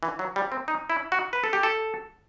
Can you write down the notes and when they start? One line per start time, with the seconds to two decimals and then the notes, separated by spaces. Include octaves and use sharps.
0.03 E3
0.19 F#3
0.36 G3
0.52 C4
0.68 D#4
0.90 E4
1.12 F#4
1.33 B4
1.44 A4
1.53 G4
1.63 A4